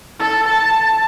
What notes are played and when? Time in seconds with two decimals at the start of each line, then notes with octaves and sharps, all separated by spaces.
0.19 A4
0.48 A5